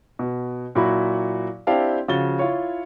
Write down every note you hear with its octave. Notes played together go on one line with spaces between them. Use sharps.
B2
A#2 F#3 E4 F#4 B5
C4 D4 E4 G4 F5 A5
C#3 F3 F#4 A6 G7
E4 F4 C#5